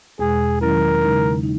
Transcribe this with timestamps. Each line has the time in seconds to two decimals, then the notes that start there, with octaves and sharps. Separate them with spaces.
0.19 E2 B2 G#3 G#4
0.61 D#3 F#3 C#4 E4 A#4
1.02 C#3 G#3 D#4
1.43 D#4